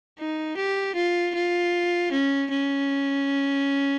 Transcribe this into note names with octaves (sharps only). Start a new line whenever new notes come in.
D#4
G4
F4
F4
C#4
C#4